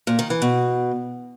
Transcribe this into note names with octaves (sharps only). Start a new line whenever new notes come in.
A#2
D#3
E3
B2